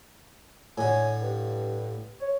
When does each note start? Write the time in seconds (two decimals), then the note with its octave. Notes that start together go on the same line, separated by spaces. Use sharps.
0.78 A2 D3 C#5 G#5
1.22 G2
2.21 C#5